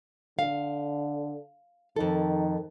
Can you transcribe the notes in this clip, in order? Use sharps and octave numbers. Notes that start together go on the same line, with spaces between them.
D3 F5
F2 D#3 A4